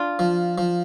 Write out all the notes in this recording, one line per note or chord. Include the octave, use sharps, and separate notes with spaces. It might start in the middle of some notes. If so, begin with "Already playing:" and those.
Already playing: D4 F4
F3
F3